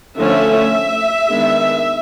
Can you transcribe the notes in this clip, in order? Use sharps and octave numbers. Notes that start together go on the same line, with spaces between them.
D3 F3 A3 C#4 E5
D#3 G#3 B3 D4